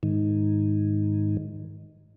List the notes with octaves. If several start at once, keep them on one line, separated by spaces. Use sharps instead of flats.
G#2 D#3